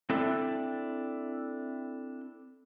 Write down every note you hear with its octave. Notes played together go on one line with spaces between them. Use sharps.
C4 D4 E4 A4 E5